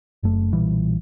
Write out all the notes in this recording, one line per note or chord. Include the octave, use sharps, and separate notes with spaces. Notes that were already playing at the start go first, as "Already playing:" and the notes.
F#1 F#2 A3
B1 A#2 E3 G3